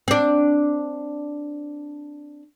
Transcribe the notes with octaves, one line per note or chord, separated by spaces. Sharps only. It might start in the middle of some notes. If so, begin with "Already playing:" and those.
C4 D4